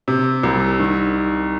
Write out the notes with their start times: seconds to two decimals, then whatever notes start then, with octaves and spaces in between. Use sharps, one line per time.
0.08 C3
0.43 C2
0.79 D#3